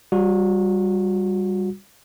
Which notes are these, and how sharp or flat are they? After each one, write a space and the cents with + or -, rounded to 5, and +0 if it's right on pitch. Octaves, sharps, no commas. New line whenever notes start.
G3 +5 F#4 -35